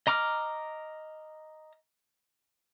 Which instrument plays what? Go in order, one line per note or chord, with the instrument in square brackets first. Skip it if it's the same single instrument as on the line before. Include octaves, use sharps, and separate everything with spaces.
[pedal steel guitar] D#5 A#5 D6 F6